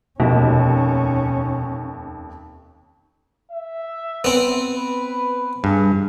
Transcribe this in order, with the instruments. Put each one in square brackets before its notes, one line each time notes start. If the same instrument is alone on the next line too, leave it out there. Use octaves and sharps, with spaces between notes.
[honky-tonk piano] F1 D#2 [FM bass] B2 [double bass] C#4
[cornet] E5
[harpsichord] B3 C4
[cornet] B4
[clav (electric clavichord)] G2 [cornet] G#4